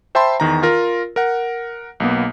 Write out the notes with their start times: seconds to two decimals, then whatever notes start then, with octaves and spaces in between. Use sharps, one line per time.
0.15 C5 E5 G5 A5 B5 C6
0.40 E2 D#3 A#5
0.63 F4 A#4
1.16 A#4 F#5
2.00 B1 A#3 B3